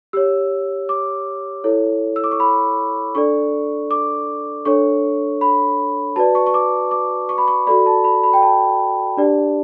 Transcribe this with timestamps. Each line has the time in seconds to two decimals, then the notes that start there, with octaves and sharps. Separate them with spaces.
0.13 G4 C#5 E6
0.89 D6
1.64 E4 A4 C#5
2.16 E6
2.24 D6
2.31 C#6
2.40 B5
3.15 D4 A4 D5 C#6
3.91 D6
4.65 D4 A4 C#5 C#6
5.41 B5
6.16 F#4 B4 D5 A5
6.35 C#6
6.47 C#6
6.54 D6
6.91 D6
7.29 C#6
7.38 B5
7.48 C#6
7.67 F#4 A4 D5 B5
7.86 A5
8.04 B5
8.23 B5
8.33 G5
8.42 A5
9.17 D4 G4 D5